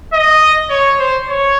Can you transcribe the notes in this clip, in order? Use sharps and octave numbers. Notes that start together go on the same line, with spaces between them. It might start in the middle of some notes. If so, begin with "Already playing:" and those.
D#5
C#5
C5
C#5